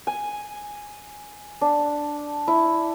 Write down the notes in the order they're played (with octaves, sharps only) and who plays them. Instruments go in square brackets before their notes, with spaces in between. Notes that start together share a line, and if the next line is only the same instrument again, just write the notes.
[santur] G#5
D4
E4